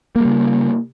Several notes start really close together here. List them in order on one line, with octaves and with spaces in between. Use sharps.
A#3 G3 C#3